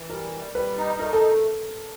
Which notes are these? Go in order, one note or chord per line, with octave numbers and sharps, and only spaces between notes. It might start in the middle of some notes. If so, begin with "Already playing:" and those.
Already playing: E3
G3 A#4
G3
G3 B4
D#4
A3 A#4
A4